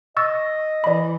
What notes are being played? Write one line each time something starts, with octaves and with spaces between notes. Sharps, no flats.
D#5 C#6 E6 A6
E3 D5 B5